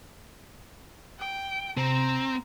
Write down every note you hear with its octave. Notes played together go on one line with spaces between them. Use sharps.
G5
C3 C4 A#5